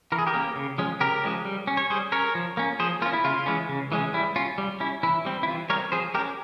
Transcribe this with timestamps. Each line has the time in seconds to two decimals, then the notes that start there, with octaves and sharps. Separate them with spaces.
0.12 E3 A#4
0.19 G#4
0.27 G4 A#4
0.34 A#3 C#4
0.56 C#3
0.78 F3 G#3 C#4
1.00 C#3 G4 A#4
1.23 F3 G#3 C#4
1.45 G3
1.67 C#4
1.77 C#5
1.90 G3 G#4 C5
2.12 C#4 A#4 C#5
2.35 F3
2.57 A#3 C#4
2.80 F3 G#4 C5
3.02 A#3 F4
3.06 C#4
3.13 E4
3.24 C#3 F4
3.46 E3 G#3 C#4
3.69 C#3
3.92 E3 G#3 C#4
4.13 G3 E4
4.36 C#4 F4
4.58 G3
4.80 C#4 E4
5.03 E3 E4
5.25 G3 C4
5.43 E4
5.47 E3 F4
5.70 G3 A#4 C#5
5.73 C4
5.92 F3 G#4 C5
6.14 G#3 G4 A#4
6.19 C#4